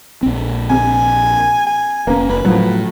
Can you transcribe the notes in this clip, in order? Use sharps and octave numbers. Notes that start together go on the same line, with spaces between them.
A#1 C4
C3 G#5
G#5
F1 A#3 B3 C#4
F1 B4
A2 F3 F#3